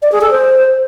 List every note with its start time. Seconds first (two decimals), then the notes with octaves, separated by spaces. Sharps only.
0.02 D5
0.11 G#4
0.21 A4
0.30 C5